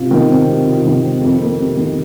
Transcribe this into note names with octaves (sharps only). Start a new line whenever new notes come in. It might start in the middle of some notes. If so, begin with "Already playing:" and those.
Already playing: C3 F4
D#3
C4
C3
F4
D#3
C4
F2
A#3
C3
D#3